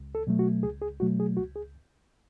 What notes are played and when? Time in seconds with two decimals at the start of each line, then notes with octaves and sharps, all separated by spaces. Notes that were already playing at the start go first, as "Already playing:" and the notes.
Already playing: C#2
0.15 A4
0.27 B2 F#3 A3
0.39 F#4
0.63 C#2 G#4
0.82 G#4
1.00 B2 F#3 A3 F#4
1.20 G#4
1.37 C#2 F#4
1.56 G#4